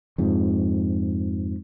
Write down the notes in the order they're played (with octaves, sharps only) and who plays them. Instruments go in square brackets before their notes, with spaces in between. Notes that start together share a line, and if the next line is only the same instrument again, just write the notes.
[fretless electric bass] F2 G#2 F3